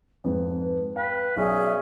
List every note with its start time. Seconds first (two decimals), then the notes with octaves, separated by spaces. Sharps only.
0.24 F2 G#2 B4
0.96 B4 F5 G5
1.37 B1 C#4 G#4 D5 E5